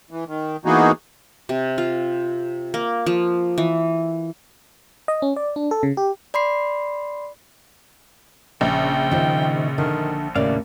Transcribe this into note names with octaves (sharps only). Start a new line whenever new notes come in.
E3
D#3
E3 A#3 B3 D#4 F#4 G#4
C3
F4
A#3
F3
E3
D#5
C#4
D5
D4
A4
C#3
G4
D5 B5 C6 C7
A#1 C#3 D4 G5
D#3 F4 C5
D3 D#3
D#2 A2 C#3 A#3 D4 D5 F5